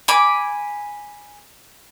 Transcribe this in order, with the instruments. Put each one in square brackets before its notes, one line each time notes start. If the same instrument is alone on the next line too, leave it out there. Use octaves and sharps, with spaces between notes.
[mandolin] G#5 B5 D6